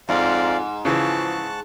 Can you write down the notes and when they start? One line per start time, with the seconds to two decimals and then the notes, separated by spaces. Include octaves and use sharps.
0.09 F2 G#2 D5 F5
0.85 C#3 E3 F3 A5 C#6 F#6